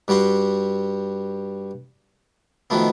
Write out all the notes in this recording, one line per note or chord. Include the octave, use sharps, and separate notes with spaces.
G2 G3 F#4 F#5 C6
B2 D#3 F3 A3 B3